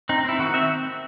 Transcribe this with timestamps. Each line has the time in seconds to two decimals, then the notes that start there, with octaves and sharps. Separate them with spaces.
0.09 C4 D#4
0.25 C4 E4
0.39 D#3 F#4
0.54 C4 E5